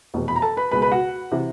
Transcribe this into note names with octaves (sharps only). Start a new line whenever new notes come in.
F1 E2 B2
B5
A#5
A4 A5
B4 B5
C#2 B2 G#3 B4 B5
B4 B5
F#4 F#5
C3 E3